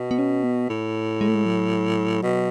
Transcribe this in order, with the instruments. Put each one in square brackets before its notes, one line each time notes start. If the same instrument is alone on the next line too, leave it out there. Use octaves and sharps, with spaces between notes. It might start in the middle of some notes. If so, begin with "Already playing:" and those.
Already playing: [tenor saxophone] B2
[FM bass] B3
C#4
B3
[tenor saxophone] A2
[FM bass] G#3
A3
G#3
F#3
[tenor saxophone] B2